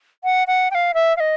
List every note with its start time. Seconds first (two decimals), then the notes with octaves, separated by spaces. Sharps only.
0.24 F#5
0.47 F#5
0.71 G5
0.75 F5
0.94 E5
1.17 F5
1.20 D#5